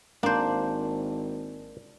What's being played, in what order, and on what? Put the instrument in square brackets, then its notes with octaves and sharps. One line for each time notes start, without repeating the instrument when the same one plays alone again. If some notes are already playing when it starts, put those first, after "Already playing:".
[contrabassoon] G#1 [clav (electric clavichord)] A#3 D5 [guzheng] D4 C5